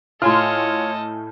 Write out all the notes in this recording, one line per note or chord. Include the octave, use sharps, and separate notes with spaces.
A2 F4 A4 C#5 D#5 G#5 F6